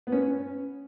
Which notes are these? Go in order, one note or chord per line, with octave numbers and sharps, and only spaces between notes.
B3
C#4
B4
C#4